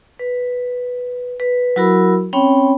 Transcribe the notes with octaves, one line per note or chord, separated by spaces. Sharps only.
B4
B4
F#3 E4 F#4 A#4 B5 E6
C4 C#4 C#5 G5 B5